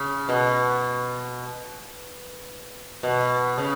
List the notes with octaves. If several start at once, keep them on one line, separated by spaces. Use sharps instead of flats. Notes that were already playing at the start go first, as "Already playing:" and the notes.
Already playing: C#3
B2
B2
C#3